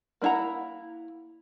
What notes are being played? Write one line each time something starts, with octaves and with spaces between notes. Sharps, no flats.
A#3 D4 E4 F#5 A#5